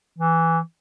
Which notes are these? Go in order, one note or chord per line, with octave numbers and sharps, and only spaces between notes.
E3